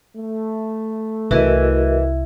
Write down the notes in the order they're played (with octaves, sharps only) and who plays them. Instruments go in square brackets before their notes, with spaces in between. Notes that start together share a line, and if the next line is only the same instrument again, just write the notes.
[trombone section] A3
[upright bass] C2 [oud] E3 [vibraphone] F#4 A#4 D#5